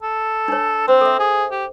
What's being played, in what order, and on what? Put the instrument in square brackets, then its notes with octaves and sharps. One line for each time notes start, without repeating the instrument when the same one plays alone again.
[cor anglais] A4
[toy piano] D4 C#5
[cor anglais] C4 [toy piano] C5
[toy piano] A4 E5
[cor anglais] G#4
G4